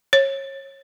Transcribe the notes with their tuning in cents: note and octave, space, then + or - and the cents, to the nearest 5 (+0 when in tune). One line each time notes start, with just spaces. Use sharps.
C#5 -25